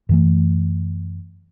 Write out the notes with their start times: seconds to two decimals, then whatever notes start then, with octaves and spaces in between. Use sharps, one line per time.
0.09 F#2 E3 A3